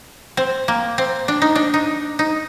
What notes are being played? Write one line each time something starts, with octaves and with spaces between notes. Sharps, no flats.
C4
A#3
C4
D4
D#4
D4
D#4
D#4